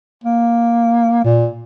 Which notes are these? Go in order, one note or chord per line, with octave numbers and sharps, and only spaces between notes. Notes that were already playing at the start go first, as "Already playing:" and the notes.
A#3
A#2